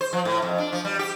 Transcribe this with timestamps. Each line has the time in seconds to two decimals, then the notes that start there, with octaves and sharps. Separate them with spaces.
0.01 C5
0.13 F3
0.25 A2
0.42 F2
0.58 D4
0.73 F3
0.85 G3
0.99 G4